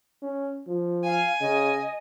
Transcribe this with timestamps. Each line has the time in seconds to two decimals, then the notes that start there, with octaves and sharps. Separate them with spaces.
0.22 C#4
0.67 F3
1.04 F5 G#5
1.41 C#3 D#5